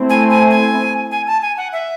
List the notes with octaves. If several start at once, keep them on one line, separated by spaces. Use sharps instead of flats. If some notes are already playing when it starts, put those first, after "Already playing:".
Already playing: A3 C4 E4
G#5
G#5
G#5
G#5
A5
G#5
F#5
E5